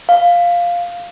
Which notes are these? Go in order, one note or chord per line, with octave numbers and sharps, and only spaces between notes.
F5